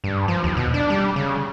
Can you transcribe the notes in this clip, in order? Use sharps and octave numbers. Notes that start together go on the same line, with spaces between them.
G2
F3
D#2
B2
D4
G3
C#3